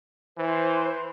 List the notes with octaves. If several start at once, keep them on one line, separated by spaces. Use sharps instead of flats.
E3 C5